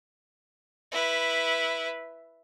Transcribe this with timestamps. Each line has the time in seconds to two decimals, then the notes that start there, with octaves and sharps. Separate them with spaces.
0.92 E4 B4